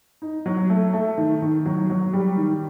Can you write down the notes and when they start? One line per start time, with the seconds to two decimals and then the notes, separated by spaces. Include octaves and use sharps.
0.22 D#4
0.46 F#3
0.70 A3
0.93 A3
1.18 D#3
1.42 D#3
1.66 F#3
1.90 F#3
2.13 G3
2.37 D#3